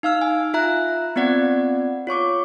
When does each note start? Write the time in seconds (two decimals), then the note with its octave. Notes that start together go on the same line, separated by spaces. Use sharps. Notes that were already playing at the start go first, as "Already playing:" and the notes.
0.03 D#4 F5 E6 F6
0.22 G#5
0.54 F4 E5 A#5 F#6
1.16 B3 C4 F4 D5 F#5 G#6
2.07 F4 C#5 C#6 D6